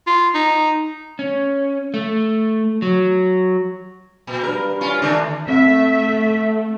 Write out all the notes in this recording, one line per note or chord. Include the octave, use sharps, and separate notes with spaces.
F4
D#4
C#4
A3
F#3
A#2
G3 D4 A#4 B4
C#4 F4
D3 A3 D4 E4
A3 C4 E5